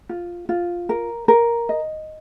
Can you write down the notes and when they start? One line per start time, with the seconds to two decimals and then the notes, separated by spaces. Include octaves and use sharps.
0.09 F4
0.49 F4
0.89 A#4
1.28 A#4
1.69 D#5